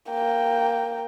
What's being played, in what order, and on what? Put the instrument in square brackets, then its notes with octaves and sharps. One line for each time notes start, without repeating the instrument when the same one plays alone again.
[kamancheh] A#3 G5